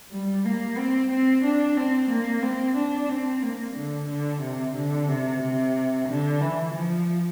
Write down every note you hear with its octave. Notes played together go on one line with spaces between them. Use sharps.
G3
A#3
C4
C4
D4
C4
A#3
C4
D4
C4
A#3
D3
D3
C3
D3
C3
C3
D3
E3
F3